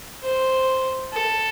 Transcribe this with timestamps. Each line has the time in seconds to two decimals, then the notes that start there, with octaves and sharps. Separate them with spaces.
0.23 C5
1.13 A4